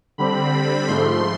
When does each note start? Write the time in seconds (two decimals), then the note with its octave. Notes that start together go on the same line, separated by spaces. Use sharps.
0.18 D3 G3 C4 B5
0.87 G#2 F3 A3 C6